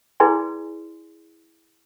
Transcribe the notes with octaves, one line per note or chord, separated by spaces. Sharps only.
E4 G#4 B4 D5 G#5 C6